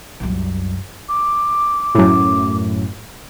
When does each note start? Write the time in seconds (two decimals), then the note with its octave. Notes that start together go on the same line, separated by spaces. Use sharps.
0.20 C2 F#2
1.09 D6
1.95 F#2 A2